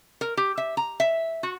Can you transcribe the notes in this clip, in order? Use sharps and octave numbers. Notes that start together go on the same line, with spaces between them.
A#4
G4
E5
A#5
E5
F#4